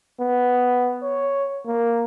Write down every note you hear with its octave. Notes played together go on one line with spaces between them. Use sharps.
B3
C#5
A#3